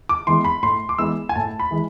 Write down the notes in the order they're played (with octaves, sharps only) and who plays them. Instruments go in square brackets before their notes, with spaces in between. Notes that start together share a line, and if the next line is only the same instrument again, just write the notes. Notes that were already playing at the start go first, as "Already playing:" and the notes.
[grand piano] D6
E3 G#3 B3 C6
B5
A2 C6
D6
E3 G#3 B3 E6
G#5
A2 A5
B5
E3 G#3